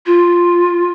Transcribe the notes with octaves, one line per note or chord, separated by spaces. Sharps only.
F4